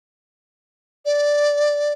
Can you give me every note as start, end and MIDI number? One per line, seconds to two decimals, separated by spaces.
1.05 1.93 74